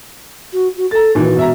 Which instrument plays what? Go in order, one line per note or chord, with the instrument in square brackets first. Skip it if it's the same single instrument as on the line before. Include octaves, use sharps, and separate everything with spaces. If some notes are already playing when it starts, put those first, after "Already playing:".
[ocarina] F#4
F#4
[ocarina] A4 [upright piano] A#5 A6
[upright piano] A#2 D#3 E3 [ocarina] F#4
[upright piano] E1 E5 A#5